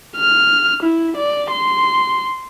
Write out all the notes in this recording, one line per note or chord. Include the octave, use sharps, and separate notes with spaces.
F6
E4
D5
C6